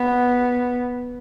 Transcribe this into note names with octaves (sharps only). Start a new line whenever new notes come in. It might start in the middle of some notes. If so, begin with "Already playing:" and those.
Already playing: B3